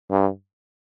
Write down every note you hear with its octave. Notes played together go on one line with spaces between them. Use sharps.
G2